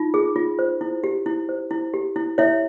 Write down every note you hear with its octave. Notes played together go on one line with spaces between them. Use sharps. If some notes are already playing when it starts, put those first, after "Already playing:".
Already playing: D#4 F4
G#4
F4
C5
E4
G4
E4
C5
E4
G4
E4
E4 C#5 E5